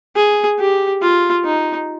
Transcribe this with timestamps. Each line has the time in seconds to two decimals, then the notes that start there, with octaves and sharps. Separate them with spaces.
0.16 G#4
0.59 G4
1.02 F4
1.44 D#4